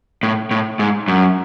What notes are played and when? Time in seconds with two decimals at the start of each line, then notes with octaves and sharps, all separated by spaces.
0.23 A2
0.51 A2
0.79 G#2
1.08 F#2